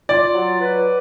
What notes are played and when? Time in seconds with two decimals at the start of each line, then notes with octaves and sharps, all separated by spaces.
0.08 F4 D5
0.34 F#3
0.60 B4